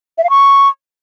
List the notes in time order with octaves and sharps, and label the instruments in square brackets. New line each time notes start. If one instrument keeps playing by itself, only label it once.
[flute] E5
F5
C#6